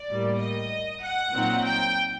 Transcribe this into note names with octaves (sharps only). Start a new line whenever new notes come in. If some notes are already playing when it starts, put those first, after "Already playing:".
Already playing: D5
A2 G3 A#3
D#5
F#5
A#2 F#3 C4 D#4
G5